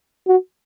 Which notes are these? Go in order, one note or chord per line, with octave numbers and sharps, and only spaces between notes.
F#4